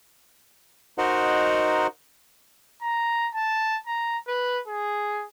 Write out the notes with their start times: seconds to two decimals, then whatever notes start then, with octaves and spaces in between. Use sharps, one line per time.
0.98 D#4 F#4 A#4 C5 D#5 F#5
2.82 A#5
3.34 A5
3.87 A#5
4.27 B4
4.67 G#4